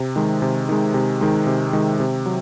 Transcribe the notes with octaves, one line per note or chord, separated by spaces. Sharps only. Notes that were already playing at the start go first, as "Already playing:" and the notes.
Already playing: C3
D#3 G#3
C3
D#3 G#3
C3
D#3 G#3
C3
D#3 G#3
C3
F#3